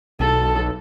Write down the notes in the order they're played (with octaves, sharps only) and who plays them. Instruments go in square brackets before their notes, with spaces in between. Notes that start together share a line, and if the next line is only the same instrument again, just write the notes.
[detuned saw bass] B1 [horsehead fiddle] A4